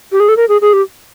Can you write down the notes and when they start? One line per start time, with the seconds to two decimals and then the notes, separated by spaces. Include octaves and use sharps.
0.12 G4
0.20 G#4
0.28 A4
0.37 A#4
0.49 G#4
0.62 G#4
0.73 G4